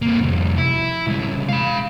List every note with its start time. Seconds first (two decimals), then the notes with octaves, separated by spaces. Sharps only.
0.02 A#3 C4
0.19 C2 F2
0.57 E4
1.07 C2 G#3
1.49 F5 B5